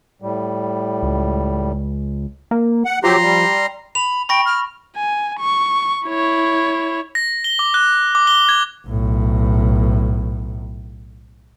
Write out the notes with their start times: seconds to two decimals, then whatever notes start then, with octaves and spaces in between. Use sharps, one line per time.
0.22 A2 G3
1.03 C#2
2.51 A#3
2.85 F#5
3.04 F3 F#3 G4 A#5 C6
3.22 G3
3.95 B5 F7
4.29 G5 B5 C#6 A#6
4.46 F6
4.96 G#5
5.40 C#6
6.07 E4 C#5
7.15 A#6
7.44 G7
7.59 D6
7.74 F#6
8.15 D6
8.27 G7
8.49 G#6
8.87 B1 A2